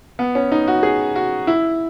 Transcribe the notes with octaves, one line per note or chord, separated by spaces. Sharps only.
B3
C#4
D#4
F#4
G#4
F#4
E4